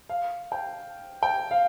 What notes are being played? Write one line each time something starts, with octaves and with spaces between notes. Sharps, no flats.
F5
G5
G5
F5